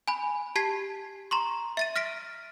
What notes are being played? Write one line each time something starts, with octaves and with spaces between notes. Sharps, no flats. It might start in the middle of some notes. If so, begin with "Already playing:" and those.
G#5 B5
G4 A5 G#6 B6 C7
A#5 C6 C#6
E5 A6 D#7
F6 A#6 B6 D7